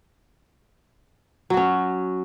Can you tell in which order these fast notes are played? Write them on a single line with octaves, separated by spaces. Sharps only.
F#3 F#4 C#4